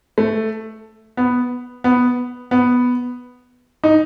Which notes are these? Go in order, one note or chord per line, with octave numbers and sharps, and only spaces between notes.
A3
B3
B3
B3
D#4